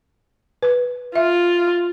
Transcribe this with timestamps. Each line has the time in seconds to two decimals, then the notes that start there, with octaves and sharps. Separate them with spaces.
0.62 B4
1.15 F4 E5